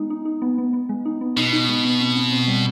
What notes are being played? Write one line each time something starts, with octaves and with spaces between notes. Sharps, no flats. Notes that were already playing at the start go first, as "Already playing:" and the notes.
Already playing: G#3 B3 D#4
D#4
D#4
B3
B3
B3
G#3
D#4
B3
B2 D#4
D#4
G#3
B3
C4
C4
C4
G3